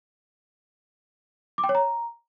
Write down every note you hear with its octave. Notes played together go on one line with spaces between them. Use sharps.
D6
G5
C#5
A#5